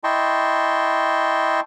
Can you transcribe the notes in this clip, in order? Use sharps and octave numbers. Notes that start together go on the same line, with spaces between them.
E4 D#5 G5 A5 C6 C#6